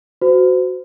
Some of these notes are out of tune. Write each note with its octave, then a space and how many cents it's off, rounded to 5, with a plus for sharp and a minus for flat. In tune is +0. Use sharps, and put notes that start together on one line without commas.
F#4 +0 C5 -35